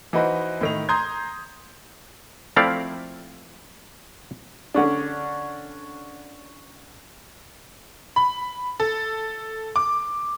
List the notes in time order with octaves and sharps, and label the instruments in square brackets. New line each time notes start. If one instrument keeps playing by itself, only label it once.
[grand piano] E3 D#4 F#4 B4 C5 D#5
A2 D#3 F7
A#5 C6 D#6 G6 G#6
[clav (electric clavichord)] F3 A3 C4 E4 D5 F5
[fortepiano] D3 C#4 D4
[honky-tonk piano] B5
A4
D6